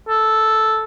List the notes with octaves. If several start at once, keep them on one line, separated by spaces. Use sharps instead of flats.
A4